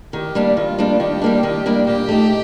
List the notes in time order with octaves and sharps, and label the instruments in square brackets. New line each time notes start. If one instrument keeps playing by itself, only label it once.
[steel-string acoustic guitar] D#3 [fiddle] G4
[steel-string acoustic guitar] G3 A#3 D4
[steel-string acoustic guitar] D#3 [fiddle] F4
[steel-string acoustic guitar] G3 A#3 D4
[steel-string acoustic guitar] D#3 [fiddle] G4
[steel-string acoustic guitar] G3 A#3 D4
D#3
G3 A#3 D4
[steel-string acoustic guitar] A#2 [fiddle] G4
[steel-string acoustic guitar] A3 D#4